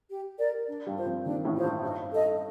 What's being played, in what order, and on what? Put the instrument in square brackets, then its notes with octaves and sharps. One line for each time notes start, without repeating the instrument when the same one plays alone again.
[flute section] G4
A#4 D5
D4
[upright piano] G2 G3
[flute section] F4 C5
[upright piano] F2 F3
[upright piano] D#2 D#3 [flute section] D4
[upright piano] A1 A2
[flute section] F4 C5
[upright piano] G2
[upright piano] G2 [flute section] D#4
[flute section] A4 D#5